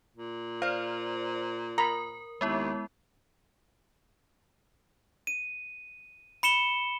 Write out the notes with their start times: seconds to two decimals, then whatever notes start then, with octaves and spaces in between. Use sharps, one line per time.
0.16 A#2
0.62 C5 D5 F5
1.78 A#4 A#5 B5
2.41 D#2 G#3 B3 E4
5.27 D#7
6.43 B5 C#7 E7 G7